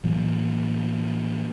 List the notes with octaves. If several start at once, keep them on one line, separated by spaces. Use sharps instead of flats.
A2 E3 F#3 A#3